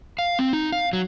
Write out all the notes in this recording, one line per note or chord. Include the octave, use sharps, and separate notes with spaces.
F5
C4
D#4
F5
F#3